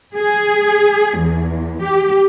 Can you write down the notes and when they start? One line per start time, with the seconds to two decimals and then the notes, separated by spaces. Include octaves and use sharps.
0.15 G#4
1.18 E2
1.83 G4